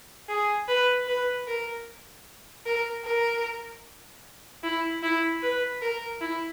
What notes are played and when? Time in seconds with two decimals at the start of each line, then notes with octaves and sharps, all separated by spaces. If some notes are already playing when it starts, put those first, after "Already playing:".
0.29 G#4
0.68 B4
1.08 B4
1.47 A#4
2.66 A#4
3.05 A#4
4.63 E4
5.03 E4
5.43 B4
5.82 A#4
6.21 E4